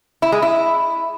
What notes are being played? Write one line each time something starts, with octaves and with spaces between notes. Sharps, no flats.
E4
G#3
E4